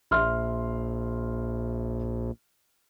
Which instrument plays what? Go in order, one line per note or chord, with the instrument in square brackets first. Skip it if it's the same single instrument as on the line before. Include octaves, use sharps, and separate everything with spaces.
[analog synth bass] A#1 [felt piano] E5 C6 F6